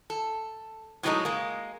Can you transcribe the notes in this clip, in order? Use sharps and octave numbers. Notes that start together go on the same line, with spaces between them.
A4
A2 C#3 F#3 G#3 A3 D#4
G#3 A#3